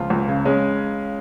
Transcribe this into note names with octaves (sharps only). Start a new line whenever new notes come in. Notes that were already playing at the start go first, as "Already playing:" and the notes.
Already playing: C#2 F3 F4
C#2
C#3
G#3 C#4